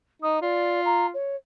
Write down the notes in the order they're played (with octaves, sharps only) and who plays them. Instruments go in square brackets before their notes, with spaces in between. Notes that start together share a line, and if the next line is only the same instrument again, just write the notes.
[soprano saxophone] D#4 [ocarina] D#6
[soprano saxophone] F4 [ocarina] D5
[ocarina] A#5
C#5